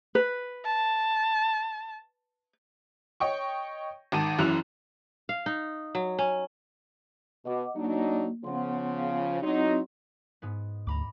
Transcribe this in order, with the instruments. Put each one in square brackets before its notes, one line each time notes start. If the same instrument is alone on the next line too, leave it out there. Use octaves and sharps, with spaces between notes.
[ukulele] B4
[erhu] A5
[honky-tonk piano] C#5 D#5 G5 C#6
G#1 D#3 A5 D#7
F#1 F#2 E3 E4 F#6 F7
[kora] F5
D#4
F#3
C#4
[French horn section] B2 [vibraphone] D#5 F#5 D6
[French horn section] F#3 D4 D#4 [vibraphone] A#3
[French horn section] C#3 F3 [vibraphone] B3 F#5 C6
[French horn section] F#3 D#4 [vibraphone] C4 E4 C6
[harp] G#2 B3
[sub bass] D2 [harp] A#5 B5 D6